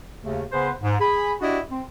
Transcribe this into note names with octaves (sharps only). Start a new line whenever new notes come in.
D#2 C#3 A3
C#3 B3 G#4 B4 C5
G#2
G#4 B5
D4 E4 F#4 G4 D5 D#5
C4